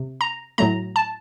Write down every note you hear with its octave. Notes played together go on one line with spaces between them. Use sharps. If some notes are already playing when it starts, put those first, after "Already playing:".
Already playing: C3
A#5
A2 F#3 A3 A#5
A5